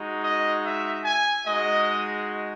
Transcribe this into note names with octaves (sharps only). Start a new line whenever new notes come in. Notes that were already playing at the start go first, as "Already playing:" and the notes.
Already playing: G#3 D#4 F#4
D#5
E5
G#5
G#3 D#4 F#4 D#5